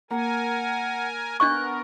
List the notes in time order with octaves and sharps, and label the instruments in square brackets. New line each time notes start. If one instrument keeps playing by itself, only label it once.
[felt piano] A#3 [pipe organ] A#4 G#5 [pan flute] F#5
[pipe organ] B3 A#4 [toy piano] D4 D#5 C#6 [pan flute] F#6